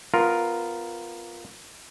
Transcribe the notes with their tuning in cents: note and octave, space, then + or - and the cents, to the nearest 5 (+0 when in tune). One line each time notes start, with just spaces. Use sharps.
B3 +15 F4 +0 A#4 +0